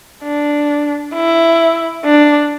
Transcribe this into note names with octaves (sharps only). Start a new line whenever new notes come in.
D4
E4
D4